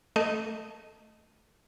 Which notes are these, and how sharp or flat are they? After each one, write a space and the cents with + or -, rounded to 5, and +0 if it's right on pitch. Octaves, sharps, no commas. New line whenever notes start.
A3 +0 D#5 +0